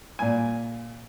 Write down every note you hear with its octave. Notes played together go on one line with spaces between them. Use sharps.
A#2 G#5